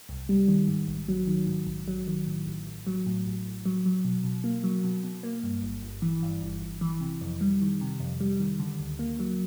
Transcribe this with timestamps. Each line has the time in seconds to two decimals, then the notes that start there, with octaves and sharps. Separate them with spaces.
0.09 C2
0.29 G3
0.48 D#3
0.68 G#2
0.88 A#1
1.09 F#3
1.27 D#3
1.47 G#2
1.67 A#1
1.88 F#3
2.07 D#3
2.27 A2
2.46 A1
2.66 A1
2.87 F#3
3.06 A2
3.26 A1
3.45 A1
3.66 F#3
3.85 F#3
4.05 B2
4.24 B2
4.44 A#3
4.64 F#3
4.84 B2
5.03 B2
5.23 A#3
5.43 G2
5.62 G1
5.83 G1
6.02 E3
6.23 G2
6.42 G1
6.62 G1
6.81 E3
7.01 C3
7.21 F2
7.41 G3
7.61 D#3
7.81 C3
8.00 F2
8.20 G3
8.40 D#3
8.59 D3
8.79 D2
8.99 A#3
9.19 F#3